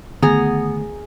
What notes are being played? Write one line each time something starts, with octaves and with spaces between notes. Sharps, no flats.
D3 D#3 A3 B3 G#4 A#5